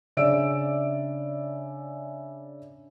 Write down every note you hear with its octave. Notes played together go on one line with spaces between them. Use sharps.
C#3 D4 D5 E5 E6 D7